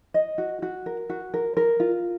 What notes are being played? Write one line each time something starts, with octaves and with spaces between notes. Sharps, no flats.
D#5
F#4
F#4
A#4
F#4
A#4
A#4
F4